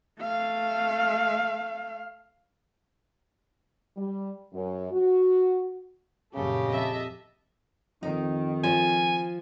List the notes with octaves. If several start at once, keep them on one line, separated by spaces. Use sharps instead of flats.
A3 F5
G3
F#2
F#4
A#1 F#2 C#3 A3 G4
F2 D#5 E5 A5
F2 D#3 D#4
F3 G#5